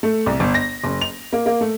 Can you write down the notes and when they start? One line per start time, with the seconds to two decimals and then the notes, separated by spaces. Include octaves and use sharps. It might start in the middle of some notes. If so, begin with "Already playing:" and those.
0.03 A3
0.26 C2
0.40 G1
0.54 A#6
0.84 F#1
1.01 F7
1.33 A#3
1.46 A#3
1.61 A3